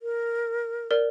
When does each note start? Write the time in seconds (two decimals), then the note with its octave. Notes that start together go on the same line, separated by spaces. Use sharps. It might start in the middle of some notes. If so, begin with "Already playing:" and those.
0.02 A#4
0.91 A#4 D5